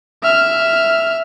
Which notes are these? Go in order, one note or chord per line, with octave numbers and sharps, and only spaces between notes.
E5 F6